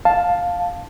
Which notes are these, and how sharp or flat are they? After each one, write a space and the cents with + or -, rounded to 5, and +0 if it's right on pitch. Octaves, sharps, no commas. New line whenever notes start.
F5 +10 A5 +0